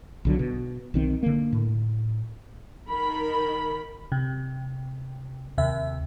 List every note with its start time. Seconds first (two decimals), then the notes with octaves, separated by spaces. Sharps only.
0.25 B1 D3 F#3
0.39 B2
0.94 B1 D#3 C4
1.23 D3 A#3
1.52 A2
2.88 D#3 A#4 B5
4.12 C3
5.58 D#2 C3 E5